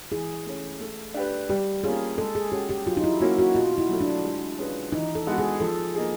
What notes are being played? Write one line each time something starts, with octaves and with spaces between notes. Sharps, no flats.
E3 G#4
A3 C#4
A3
D4 G4 B4
G3 G4
A#3 C#4 F4 G#4
G#3 A4
G#4
C#4 F#4 G4 A4
G4
F#3 F4
D#4
E4
A#3 C#4 E4 F#4
F#4
B2 F4
E4
F#3 A3
D4
G#3
C#4 F4 G#4 B4
E3 D#4
A4
G#3 B3 D#4 F#4
G#4
F3 A4
A#3 D#4 G#4